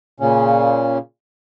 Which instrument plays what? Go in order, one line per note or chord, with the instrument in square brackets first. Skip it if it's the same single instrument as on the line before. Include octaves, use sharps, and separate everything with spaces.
[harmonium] A#2 C#3 C#4